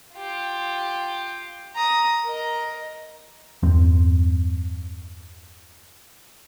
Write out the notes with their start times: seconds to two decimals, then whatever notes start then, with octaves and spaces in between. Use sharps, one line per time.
0.15 F4 G4
1.75 A#5 D#6
2.24 A#4 D#5
3.63 E2 G2 C4